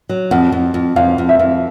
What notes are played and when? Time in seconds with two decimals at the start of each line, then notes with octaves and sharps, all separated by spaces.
0.09 F#3
0.31 F2 F#5
0.52 F2
0.74 F2
0.96 F2 F5
1.18 F2
1.29 E5
1.39 F2